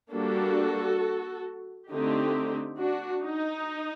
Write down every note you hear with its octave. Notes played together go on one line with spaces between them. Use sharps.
G3 A#3 D4 F#4 A4
D3 A3 C4 D#4 G4
D4 F#4
D#4